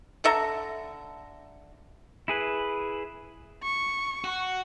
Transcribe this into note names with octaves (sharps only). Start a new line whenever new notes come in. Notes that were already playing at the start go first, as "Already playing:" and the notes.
D3 A4 E5 A#5
E4 G#4 B4
C#6
F#4